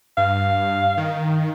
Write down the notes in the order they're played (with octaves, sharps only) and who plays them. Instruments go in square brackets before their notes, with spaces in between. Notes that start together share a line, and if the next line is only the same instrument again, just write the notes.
[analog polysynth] G2 [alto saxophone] F5
[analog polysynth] D#3